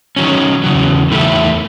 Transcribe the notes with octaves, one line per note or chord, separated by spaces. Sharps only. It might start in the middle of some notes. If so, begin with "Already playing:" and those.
D#3 F#3 C#4
E2 C#3 F#3
E2 D#3 A3 E4